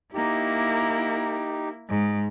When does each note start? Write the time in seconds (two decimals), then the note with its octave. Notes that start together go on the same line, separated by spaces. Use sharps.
0.14 A#3 D#4 E4 G4
1.89 G#2